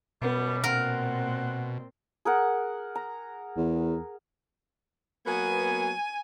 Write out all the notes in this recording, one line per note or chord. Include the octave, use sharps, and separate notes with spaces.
F#2 B2 G3 B3
A#2 C4 A#4 F#5
G#4 A#4 F#5
A#5
E2
F#3 A#3 B3 G#5